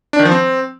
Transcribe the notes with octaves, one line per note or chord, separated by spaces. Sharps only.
D4
D#3
F3
C4